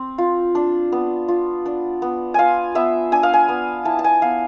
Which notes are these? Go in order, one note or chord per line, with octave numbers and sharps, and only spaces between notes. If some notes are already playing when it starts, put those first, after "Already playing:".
Already playing: C4
F4
D4
B3
F4
D4
B3
F4 F5 G#5
B3 E5
D4 G#5
F5
G#5
B3
E4 A5
A5
G#5
B3 F5